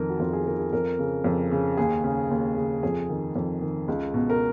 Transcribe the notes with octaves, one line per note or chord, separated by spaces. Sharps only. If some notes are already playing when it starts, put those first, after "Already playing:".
Already playing: F2 D#3 A#4
F#4
F2 F4
G#4
D#3 A#4
G#4
F2 A#4
C#3
F2
C#3
D#2 G#4
C#3
D#2
C#3
F2 G#4
D#3
F2
D#3
C#2
B2
A#4